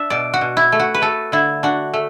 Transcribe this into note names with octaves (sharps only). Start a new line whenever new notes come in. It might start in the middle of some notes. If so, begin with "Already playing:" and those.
Already playing: D4 E5
B2 D5
F#4
B2
E4
A3
F#4
B4
A3 A4
D3 E4
D4 F#4
A3